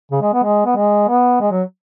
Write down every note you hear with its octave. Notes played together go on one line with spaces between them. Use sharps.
C#3
G#3
B3
G#3
B3
G#3
B3
G#3
F#3